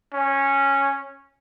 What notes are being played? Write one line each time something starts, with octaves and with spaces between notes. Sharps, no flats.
C#4